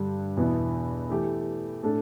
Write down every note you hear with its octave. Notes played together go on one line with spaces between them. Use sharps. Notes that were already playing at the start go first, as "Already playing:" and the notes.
Already playing: G2 D3 G3 D4 G4
E2 B2 B3 E4
E3 A3 G4
A2 A3 D4 A4